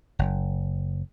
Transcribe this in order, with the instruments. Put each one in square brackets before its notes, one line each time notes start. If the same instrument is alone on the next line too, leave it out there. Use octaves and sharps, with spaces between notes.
[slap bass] F#1